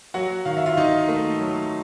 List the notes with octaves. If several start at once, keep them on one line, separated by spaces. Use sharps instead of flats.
F#3 F#4 F#5
D#3 F5
E5
F4 F5
D#3 D#4 D#5
A3
F#3